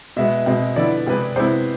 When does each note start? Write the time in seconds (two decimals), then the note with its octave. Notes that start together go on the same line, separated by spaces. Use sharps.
0.16 B2 G#3 B3 E5
0.46 B2 G#3 C4
0.76 D3 F3 B3 E4 D5
1.06 C3 G#3 C4 G#4 B4
1.36 C3 G#3 B3 E4 C5